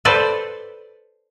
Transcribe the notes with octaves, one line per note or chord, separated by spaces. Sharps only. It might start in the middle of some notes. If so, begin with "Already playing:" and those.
A4 B4 C5 D5